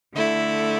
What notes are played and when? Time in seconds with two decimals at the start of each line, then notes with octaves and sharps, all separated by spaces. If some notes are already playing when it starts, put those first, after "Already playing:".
0.13 D3 A3 E4